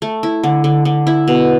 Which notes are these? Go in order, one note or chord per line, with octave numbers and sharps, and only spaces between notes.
A3
E4
D3
D3
D3
E4
B2